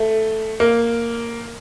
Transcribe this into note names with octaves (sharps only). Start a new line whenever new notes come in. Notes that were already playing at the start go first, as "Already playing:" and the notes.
Already playing: A3
A#3